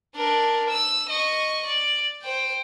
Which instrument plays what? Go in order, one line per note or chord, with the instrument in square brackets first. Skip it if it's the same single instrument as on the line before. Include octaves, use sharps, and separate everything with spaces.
[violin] D4 A#4
E6
D#5 C#6
D5
C5 G5